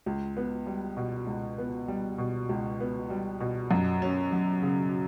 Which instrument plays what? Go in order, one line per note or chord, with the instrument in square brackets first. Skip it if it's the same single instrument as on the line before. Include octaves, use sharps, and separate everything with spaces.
[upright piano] C#2
B3
G3
B2
C#2
B3
G3
B2
C#2
B3
G3
B2
F#2
C#4
F#3
C#3